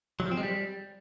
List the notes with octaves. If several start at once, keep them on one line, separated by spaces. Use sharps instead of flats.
F#3
F3
C4
G#3
G3